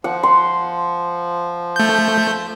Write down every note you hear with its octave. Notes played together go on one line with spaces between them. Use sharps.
F3 F#5
C6
A3 G6